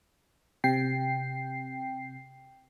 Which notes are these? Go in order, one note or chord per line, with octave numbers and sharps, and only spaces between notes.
C3 G5 C7